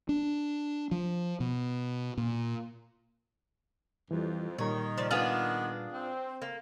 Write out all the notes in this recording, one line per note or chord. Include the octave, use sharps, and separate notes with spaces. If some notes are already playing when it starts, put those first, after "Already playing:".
D4
F3
B2
A#2
F2 E3 G3
A#2 D#3 G3 C#5 A#5
F3 D5
D#3 B3 D4 F4 G#4
C4
A#3